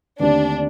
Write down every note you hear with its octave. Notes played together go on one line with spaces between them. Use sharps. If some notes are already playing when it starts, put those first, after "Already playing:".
D#2 D3 A3 C4 D4 G4